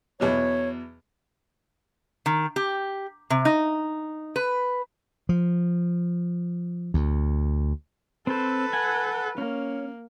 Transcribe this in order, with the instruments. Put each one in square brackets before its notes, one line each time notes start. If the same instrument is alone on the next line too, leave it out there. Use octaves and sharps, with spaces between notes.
[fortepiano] E2 B2 F#3 [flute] C#5
[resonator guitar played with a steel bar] D#3
G4
C3
D#4
B4
[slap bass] F3
D2
[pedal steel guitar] C4 C5 [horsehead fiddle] A4 B4
[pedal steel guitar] F#5 G#5
[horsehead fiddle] A#3 [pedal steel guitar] C#4